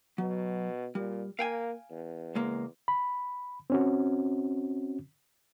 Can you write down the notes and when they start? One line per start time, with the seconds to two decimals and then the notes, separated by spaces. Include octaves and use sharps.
0.18 B2 F#3
0.95 A#2 G3
1.39 A#3 F5 G5 G#5
1.90 E2
2.35 C#2 G#3 A#3
2.88 B5
3.70 C4 C#4 F#4